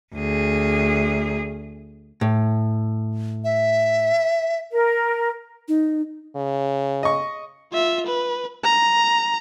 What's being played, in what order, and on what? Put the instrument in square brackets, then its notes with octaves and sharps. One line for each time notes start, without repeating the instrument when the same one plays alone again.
[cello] D2 G#4
[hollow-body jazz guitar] A2
[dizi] E5
[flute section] A#4
[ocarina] D#4
[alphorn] C#3
[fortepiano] D#5 C#6
[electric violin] F4 E5
B4
A#5